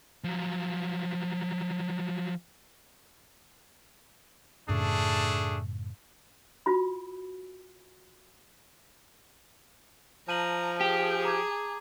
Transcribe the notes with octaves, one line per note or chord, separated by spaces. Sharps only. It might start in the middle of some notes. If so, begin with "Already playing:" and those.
F3 F#3
F#2 A2 C#3 A3 D4 G#4
F4 F#4 B5
F3 A5 A#5 D#7 F#7
G4 G#4
A#5 D6 G#6